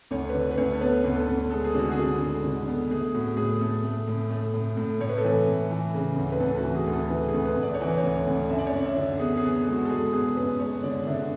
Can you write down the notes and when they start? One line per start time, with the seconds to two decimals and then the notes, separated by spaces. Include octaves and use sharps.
0.11 D2 C#5
0.29 B4
0.34 D3 C#5
0.51 B4
0.58 D2 C#5
0.73 A4
0.81 B3 B4
1.04 D2
1.16 A4
1.28 D2
1.50 G#3 A4
1.64 G#4
1.74 D3 F#4
1.92 G#4
1.98 D3
2.21 G#3
2.44 D3
2.68 B3
2.91 A3 G#4
3.14 A2 F#4
3.37 A2 G#4
3.61 A3 A4
3.84 A3
4.07 A2
4.31 A3
4.54 A2
4.77 A2
5.01 A2 C#5
5.09 B4
5.18 A4
5.24 E3 B4
5.48 A2
5.71 E3
5.94 C#3
6.16 D2
6.32 B4
6.40 D2 A4
6.58 F#4
6.63 E3
6.75 G#4
6.87 D2
6.93 A4
7.10 E3 B4
7.28 G#4
7.34 D2
7.45 B4
7.56 D2
7.63 D5
7.74 C#5
7.81 E3
7.87 B4
7.98 C#5
8.03 D2
8.27 D2
8.49 F#2 E5
8.59 D5
8.67 C#5
8.73 F#2 D5
8.85 E5
8.97 D3
9.20 B3 G#4
9.37 G#4
9.43 B3
9.55 G#4
9.66 G#3
9.72 F#4
9.85 A4
9.89 G#3 G#4
10.13 B3 G#4
10.36 F#2 B4
10.59 G#3 C#5
10.83 D3 D5
11.07 D3 E5